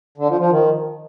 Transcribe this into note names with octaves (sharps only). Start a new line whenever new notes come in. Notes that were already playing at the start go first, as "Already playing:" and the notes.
D3
F3
F3
D#3